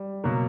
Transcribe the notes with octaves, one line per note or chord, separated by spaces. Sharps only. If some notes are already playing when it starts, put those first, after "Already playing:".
Already playing: G3
B2 F#3 A#3